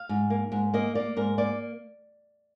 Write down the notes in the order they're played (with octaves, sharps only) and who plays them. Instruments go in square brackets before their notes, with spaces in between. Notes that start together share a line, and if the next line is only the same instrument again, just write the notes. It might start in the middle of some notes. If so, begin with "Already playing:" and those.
Already playing: [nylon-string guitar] F5
G#2
A#3
G#2
A#3 D#5
A#3 D5
G#2 A#4
A#3 D5